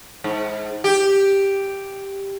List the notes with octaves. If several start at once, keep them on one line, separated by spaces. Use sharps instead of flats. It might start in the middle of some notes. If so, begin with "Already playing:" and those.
G#2
G4